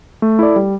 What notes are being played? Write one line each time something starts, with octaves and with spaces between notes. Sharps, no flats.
A3
E4 A4 D5
G3